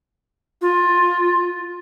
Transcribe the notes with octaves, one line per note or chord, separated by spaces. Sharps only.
F4